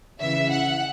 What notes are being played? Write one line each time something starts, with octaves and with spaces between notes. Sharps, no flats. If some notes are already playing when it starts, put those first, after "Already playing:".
C#3 E3 E5
F#5